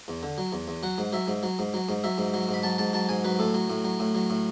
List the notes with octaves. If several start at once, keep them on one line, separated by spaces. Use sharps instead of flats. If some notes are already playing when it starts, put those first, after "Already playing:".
E2
D3
F#3
E2
E2
F#3 F#5
G#2
F#3 E5
G#2
F#3
G#2
F#3
G#2
F#3 E5
G#2
F#3
G#2
B5
F#3 A5
G#2 A5
F#3 A5
G#2 G#5
F#3 B4
A2 A4
F#3
A2
F#3
A2
F#3
A2